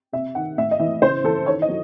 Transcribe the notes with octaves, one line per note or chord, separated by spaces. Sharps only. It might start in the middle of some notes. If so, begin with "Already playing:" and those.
C3 E5
D#3 F#5
A2 E5
D#5
E3 E5
C#3 C5
E3 A4
D#3 C#5
D#5
F#3